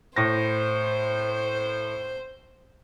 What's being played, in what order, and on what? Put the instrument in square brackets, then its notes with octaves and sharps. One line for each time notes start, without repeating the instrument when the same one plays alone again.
[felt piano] A2 A#6 [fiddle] C5